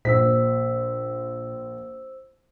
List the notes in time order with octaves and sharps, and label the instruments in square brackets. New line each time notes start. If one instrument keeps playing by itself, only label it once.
[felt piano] A#1 B6 [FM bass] A#2 [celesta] C5 E6